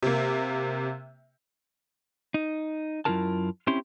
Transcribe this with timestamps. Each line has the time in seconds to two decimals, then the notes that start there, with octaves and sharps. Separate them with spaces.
0.03 C3 A#3
2.34 D#4
3.05 F#2 A#3 E4 F4 A#4 A5
3.67 C4 C#4 E4 G4 C6